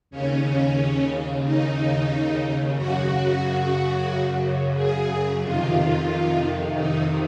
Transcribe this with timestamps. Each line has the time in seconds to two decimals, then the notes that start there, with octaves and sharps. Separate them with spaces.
0.11 D#2 C#3 C#4
1.43 D#4
2.76 F#2 C#3 F#4
4.75 G#4
5.42 F2 C3 D#3 F4
6.75 D#4